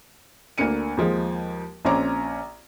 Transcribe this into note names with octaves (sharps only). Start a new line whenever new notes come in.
D2 A#3 D4 C#7 D#7
D#2 F3 G#3
A#1 C4 C#4 A#5 D6